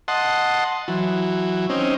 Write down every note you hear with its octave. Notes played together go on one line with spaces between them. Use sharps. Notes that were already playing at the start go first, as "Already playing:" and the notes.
D#5 F#5 A5 C6
E3 F#3
C4 C#4 D#4